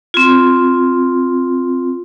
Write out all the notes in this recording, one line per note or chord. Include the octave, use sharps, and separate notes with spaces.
C4 F4